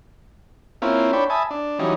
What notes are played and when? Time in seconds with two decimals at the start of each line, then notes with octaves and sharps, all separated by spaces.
0.82 A#3 C4 C#4 E4 F4
1.13 D4 C#5 G5 B5
1.30 E5 G#5 A5 B5 D#6
1.51 D4
1.79 E3 F#3 G3 C#4 D#4